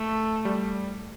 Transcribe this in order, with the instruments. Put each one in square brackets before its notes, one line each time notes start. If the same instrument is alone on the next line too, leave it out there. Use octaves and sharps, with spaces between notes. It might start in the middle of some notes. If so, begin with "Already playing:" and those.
Already playing: [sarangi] A3
[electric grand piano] G3